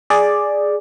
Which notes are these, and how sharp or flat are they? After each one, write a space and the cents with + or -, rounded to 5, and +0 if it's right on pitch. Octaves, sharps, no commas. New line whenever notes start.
G#4 +0 D5 +5